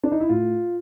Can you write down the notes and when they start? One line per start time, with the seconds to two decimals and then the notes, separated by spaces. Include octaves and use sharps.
0.04 D4
0.12 D#4
0.20 E4
0.29 A2 F4